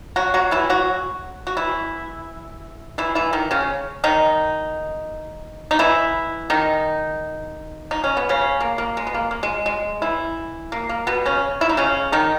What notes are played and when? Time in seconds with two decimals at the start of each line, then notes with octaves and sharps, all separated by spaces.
0.16 F#3 F#4
0.34 F#3 F#4
0.51 E3 E4
0.70 F#3 F#4
1.47 F#4
1.57 E3 E4
2.98 E3 E4
3.15 E3 E4
3.33 D#3 D#4
3.51 C#3 C#4
4.04 D#3 D#4
5.71 D#4
5.79 E3 E4
6.50 D#3 D#4
7.91 D#4
8.04 C#4
8.17 B3
8.29 C#3 C#4
8.61 A#3
8.78 A#3
8.97 G#3
9.07 B3
9.14 A#3
9.31 A#3
9.43 G#3
9.66 G#3
10.02 E3 E4
10.72 A#3
10.89 A#3
11.07 B2 B3
11.25 C#3 C#4
11.61 E4
11.69 D#4
11.77 C#3 C#4
12.12 D#3 D#4